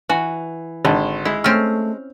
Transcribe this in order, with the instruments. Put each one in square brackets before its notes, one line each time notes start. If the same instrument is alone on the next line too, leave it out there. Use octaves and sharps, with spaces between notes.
[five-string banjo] E3 [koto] F#4
[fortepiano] G#1 [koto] D3
[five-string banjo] G#3 [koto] E4
[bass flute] A3 [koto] C4 C#4 [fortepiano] F6